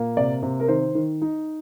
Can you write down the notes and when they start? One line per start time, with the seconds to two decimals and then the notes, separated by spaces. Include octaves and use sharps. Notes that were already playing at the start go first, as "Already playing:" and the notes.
Already playing: A#2 A#3
0.17 C3 D5
0.43 C3
0.60 A#4
0.68 D#3 C5
0.95 D#3
1.22 D#4